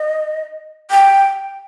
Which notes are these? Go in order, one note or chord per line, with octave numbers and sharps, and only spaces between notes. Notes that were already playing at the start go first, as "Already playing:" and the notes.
Already playing: D#5
G5